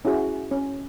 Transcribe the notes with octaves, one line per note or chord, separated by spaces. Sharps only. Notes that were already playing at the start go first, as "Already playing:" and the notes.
C#4 E4 F#4 G#4
C#4